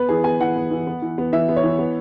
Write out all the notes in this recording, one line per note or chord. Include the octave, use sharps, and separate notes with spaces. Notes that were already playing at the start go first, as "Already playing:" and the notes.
Already playing: B3 B4
E3 G#4
B3 G#5
E3 F#5
B3
E3
B3
E3
B3
E3 E5
B3
C#5
E3
B3